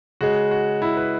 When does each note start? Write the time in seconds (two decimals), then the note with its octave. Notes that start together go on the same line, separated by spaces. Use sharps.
0.21 C#3 G#3 F#4
0.51 F#4
0.82 E4
0.97 B4